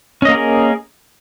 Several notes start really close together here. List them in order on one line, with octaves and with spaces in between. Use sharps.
C#4 D#5 A#3 A#4 G#4